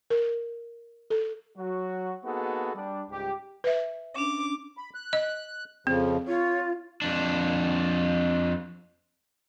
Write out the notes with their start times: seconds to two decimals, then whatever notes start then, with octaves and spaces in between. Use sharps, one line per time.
0.10 A#4
1.10 A4
1.57 F#3 F#4
2.24 A#3 B3 D#4 F#4 G#4 A4
2.75 G3 D4
3.10 C#2 G#2 G3 G4
3.64 B4 E5
4.16 C#4 D4 D6
4.77 B5
4.95 F#6
5.13 D#5
5.87 F2 C#3 F3 C4
6.27 F4 C#5
7.02 F2 D4